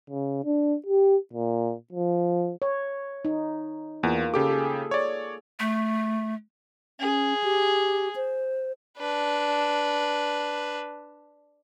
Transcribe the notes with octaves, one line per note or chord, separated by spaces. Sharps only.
C#3
D4
G4
A#2
F3
C#5
D#4
E2 A#3 F4
C#3 G4 A4 D6
G#4
C#5 D5
A3
C#4 G#4
G4
C5
D4 B4